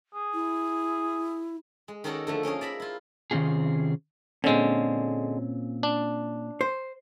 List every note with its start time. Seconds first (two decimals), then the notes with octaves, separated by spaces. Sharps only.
0.14 G#4
0.34 E4
1.88 G#3
2.04 D#3 C#4 D#4 F#4 A4 D5
2.27 D3 F3 A3
2.43 A#3 C#4 D#4 G#4
2.61 D5 E5 A#5 B5
2.80 E4 F4
3.31 C3 D#3 C4 C#4 F4 G#4
4.44 A#2 D3 G#3 C4 C#4
5.83 D4
6.61 C5